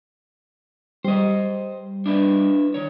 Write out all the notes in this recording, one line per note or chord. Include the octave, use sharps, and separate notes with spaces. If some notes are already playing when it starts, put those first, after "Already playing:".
G3 C5 D#5
D4 E4 B4
D#3 C#5